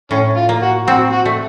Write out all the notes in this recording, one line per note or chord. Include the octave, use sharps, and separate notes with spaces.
A2 C#4
F4
A#3
F#4
C4 F#4
F#4
A3